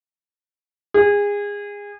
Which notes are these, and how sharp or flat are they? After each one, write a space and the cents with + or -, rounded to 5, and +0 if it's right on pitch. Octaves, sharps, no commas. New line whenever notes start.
G#4 -25